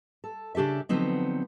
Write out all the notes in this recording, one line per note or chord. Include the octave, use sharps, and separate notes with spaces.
A4
C#3 D4 G4 A4 E5
D3 F3 F#3 B3 C4 D#4